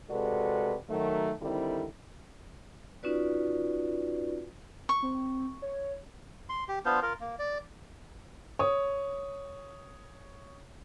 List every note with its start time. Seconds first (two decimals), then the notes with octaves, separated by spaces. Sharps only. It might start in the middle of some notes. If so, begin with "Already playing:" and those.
0.10 C3 G#3 F#4 A4 B4 D5
0.90 D#3 F#3 A3
1.42 D3 D#3 G3 C4 E4 A4
3.03 C#4 D#4 F4 F#4 B4 D5
4.89 C#6
5.02 C4
5.62 C#5
6.49 C6
6.68 G4
6.85 B3 D4 F4 C5
7.02 F4 A#4
7.20 A#3
7.39 D5
8.59 C#5 D#6